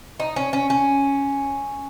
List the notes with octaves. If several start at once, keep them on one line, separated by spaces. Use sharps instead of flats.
D#4
C#4
C#4
C#4